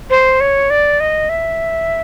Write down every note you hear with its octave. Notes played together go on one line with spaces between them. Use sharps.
C5
C#5
D5
D#5
E5